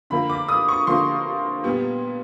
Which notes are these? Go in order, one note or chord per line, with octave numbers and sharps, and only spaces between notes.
D3 F3 A#3 B5
D6
D#6
C#6
D3 F3 A#3 C6
A#2 G3 B3